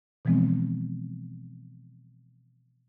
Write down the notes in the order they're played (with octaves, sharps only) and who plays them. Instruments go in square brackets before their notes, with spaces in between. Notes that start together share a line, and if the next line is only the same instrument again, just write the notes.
[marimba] B2 E3 F3 G#3 B3 C4